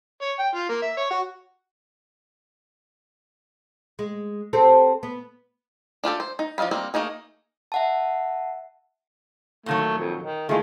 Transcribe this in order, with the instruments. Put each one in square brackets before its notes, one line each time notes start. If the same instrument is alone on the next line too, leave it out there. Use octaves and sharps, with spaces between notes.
[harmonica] C#5
G5
F4
A#3
E5
C#5
F#4
[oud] G#3
C4 G4 A4
B3
[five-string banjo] D4 F4 G4 A4
C5
D#4
F3 D4 D#5 F5 B5
G3 A#3 C4
A3 A#3 D#4 G#4
[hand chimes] E5 F#5 A5
[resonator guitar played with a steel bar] A#2 D#3 F#3 [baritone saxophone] A3
[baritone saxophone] F2
D#3
[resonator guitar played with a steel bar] D#3 [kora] E3 G#3 A3 [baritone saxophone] F4